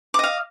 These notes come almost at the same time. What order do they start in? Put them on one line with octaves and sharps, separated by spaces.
D6 D#5 F5